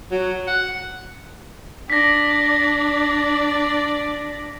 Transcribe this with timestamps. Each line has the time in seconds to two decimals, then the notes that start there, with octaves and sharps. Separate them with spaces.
0.10 F#3
0.48 F#5
1.90 D4 D5 A#6 B6